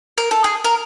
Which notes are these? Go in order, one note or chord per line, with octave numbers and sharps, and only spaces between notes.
A#4
A4
G#4
A#4